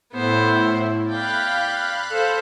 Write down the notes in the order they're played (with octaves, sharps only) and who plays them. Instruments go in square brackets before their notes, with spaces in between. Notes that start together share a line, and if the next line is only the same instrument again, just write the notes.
[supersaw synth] A2 E4 [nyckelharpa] B3 C5
[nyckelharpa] D5 G5 [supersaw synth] F5 B5 F#6
[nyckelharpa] A4 C5